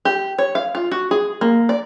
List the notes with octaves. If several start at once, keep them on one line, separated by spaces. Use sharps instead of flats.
G4
C#5
F5
F4
F#4
G#4
A#3
D5